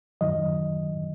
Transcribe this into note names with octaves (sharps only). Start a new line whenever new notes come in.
F#2 D#3 F#3 D#5